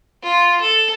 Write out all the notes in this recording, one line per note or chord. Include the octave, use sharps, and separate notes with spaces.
F4
A4